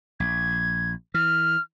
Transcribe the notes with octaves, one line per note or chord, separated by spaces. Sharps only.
A#1 G#6
E3 F6